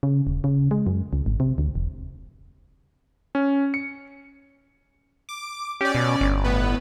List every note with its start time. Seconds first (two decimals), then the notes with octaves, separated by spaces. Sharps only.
0.03 C#3
0.27 D#1
0.44 C#3
0.71 G#3
0.87 F#2
1.13 C#2
1.26 G#1
1.40 C3
1.58 D2
1.75 E1
3.35 C#4
3.74 C#7
5.29 D6
5.81 C#4 G4 D5
5.95 B2
6.21 G1
6.44 A2 B3 B4